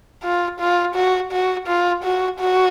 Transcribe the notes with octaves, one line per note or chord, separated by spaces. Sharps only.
F4
F4
F#4
F#4
F4
F#4
F#4